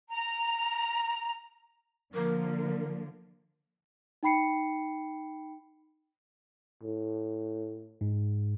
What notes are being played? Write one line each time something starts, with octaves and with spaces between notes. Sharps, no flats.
A#5
D3 F3 A#3 A#4
D#4 G5 B5 C7 C#7
A2
G#2